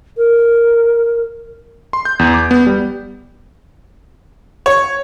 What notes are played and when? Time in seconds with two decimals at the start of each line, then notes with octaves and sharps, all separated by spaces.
0.17 A#4
1.93 C6
2.05 G6
2.19 E2
2.34 D6
2.51 B3
2.66 G3
4.66 C#5